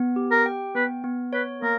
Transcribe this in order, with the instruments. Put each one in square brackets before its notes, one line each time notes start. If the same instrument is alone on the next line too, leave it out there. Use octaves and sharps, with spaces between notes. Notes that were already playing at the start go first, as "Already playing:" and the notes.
Already playing: [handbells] B3
G4
[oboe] A#4
[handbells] G5
[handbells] B3 [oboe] B4
[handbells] B3
[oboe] B4 [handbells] C#5
[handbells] A#3 [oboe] A#4